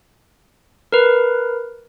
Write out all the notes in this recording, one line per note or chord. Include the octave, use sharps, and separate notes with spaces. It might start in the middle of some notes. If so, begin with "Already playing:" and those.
A#4 B4